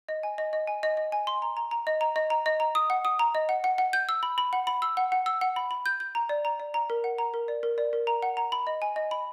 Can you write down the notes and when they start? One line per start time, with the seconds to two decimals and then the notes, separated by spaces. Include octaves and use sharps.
0.09 D#5
0.23 G#5
0.38 D#5
0.53 D#5
0.67 G#5
0.83 D#5
0.97 D#5
1.12 G#5
1.27 C6
1.42 A#5
1.57 A#5
1.71 A#5
1.87 D#5
2.01 A#5
2.16 D#5
2.30 A#5
2.46 D#5
2.60 A#5
2.75 D#6
2.90 F#5
3.05 D#6
3.19 A#5
3.35 D#5
3.49 F#5
3.64 F#5
3.78 F#5
3.93 G6
4.09 E6
4.23 B5
4.38 B5
4.53 F#5
4.67 B5
4.82 E6
4.97 F#5
5.12 F#5
5.26 E6
5.41 F#5
5.56 B5
5.71 B5
5.86 G6
6.00 G6
6.15 A#5
6.29 D5
6.45 A#5
6.60 D5
6.74 A#5
6.90 A#4
7.04 F#5
7.18 A#5
7.34 A#4
7.48 D5
7.63 A#4
7.78 D5
7.93 A#4
8.07 A#5
8.22 F#5
8.37 A#5
8.52 B5
8.67 D#5
8.82 G#5
8.96 D#5
9.11 B5